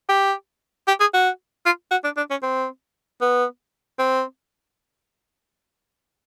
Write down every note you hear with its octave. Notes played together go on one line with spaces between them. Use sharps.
G4
G4
G#4
F#4
F4
F#4
D4
D4
C#4
C4
B3
C4